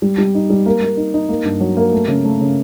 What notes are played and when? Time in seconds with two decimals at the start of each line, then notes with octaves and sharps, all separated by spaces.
0.02 G3
0.18 G3
0.35 D#4
0.50 G3
0.66 A#3
0.82 A#3
0.97 D#4
1.14 D#4
1.29 A#3
1.45 G2
1.60 F#3
1.77 A#3
1.93 A3
2.08 C#3
2.24 A3
2.41 C#3